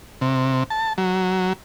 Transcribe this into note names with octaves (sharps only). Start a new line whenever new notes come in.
C3
A5
F#3